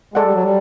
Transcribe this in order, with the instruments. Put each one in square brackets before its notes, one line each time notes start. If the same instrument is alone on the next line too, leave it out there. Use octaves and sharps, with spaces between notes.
[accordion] G#3 [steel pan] A4 D5 F#5
[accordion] G3
F#3
G3